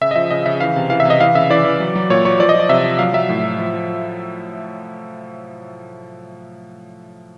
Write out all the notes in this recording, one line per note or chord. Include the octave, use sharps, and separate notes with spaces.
C#3 E5
D#5
F3 E5
C#3 D#5
C#3 E5
E3 F5
C3
E3 F5
E5
C3 D#5
E3 F5
C#3 E5
E3 D5
E3
F#3
F#3
A#2 C#5
F#3 C#5
F3 D5
D#5
F3 D5
C3 E5
F3
F#3 F5
F#3 E5
A2
F#3
F3
F3